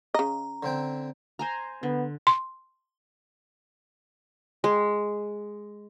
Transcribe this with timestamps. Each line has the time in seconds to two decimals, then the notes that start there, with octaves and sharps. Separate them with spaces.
0.14 C#3 D#5 A#5
0.63 D3 C4 G5
1.39 C5 G#5 A#5
1.83 D3 B3
2.27 C6
4.64 G#3